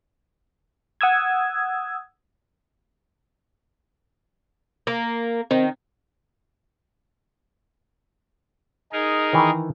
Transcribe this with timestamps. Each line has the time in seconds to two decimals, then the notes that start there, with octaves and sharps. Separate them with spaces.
1.01 F#5 D#6 E6 G#6
4.87 A#3
5.51 D#3 C4
8.92 D#4 G#4 A#4
9.33 D#3 E3